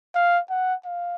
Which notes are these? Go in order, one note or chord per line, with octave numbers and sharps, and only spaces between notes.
F5
F#5
F5